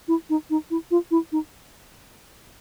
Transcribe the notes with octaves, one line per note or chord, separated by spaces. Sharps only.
E4
D#4
D#4
E4
F4
E4
D#4